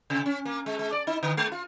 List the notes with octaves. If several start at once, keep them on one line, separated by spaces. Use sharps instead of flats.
C3
C#4
A#3
G#3
G#3
D5
D#4
D3
G#3
F4